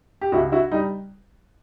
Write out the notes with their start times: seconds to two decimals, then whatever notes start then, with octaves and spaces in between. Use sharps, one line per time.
0.21 G4
0.32 C#2 E4 F#4
0.52 E4 F#4
0.72 G3 D#4